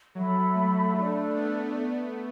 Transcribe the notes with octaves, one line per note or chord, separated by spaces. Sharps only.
F#3 A4 E5 B5
A3
A3 D4 A4 D5
B3